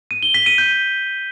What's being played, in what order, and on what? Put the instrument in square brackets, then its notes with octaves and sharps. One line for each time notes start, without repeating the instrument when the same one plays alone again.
[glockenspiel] D#7
G7
B6
D#7
G6